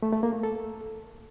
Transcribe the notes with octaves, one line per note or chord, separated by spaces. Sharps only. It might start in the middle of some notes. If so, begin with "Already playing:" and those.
A3
A3
A#3
A3
A4